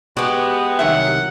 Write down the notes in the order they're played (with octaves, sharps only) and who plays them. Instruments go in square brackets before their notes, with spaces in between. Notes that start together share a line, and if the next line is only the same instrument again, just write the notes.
[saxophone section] G#3 B3 [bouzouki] F#4 G4
[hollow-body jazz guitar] C2 D#3 E5 [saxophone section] F#3 [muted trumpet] F#5